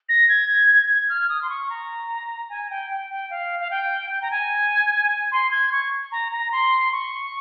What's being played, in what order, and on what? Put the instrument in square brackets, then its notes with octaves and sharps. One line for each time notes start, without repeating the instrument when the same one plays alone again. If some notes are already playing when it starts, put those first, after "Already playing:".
[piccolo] A#6
G#6
G#6
F6
D#6
C6
C#6
A#5
G#5
G5
G5
G5
F5
F5
G5
G5
A#5
G#5
C6
G#6
C#6
A#5
A#5
C6
C#6